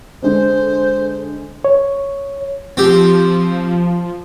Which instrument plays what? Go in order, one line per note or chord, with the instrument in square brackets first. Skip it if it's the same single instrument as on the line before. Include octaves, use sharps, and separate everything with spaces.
[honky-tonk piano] D3 G#3 D4 [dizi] C5
[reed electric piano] C#5
[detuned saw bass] F3 [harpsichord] C4 G4